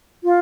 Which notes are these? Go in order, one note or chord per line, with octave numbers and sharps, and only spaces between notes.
F4